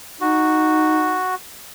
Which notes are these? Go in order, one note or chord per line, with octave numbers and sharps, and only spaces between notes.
D#4 F#4